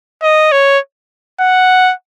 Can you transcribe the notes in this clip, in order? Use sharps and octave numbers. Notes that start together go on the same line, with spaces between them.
D#5
C#5
F#5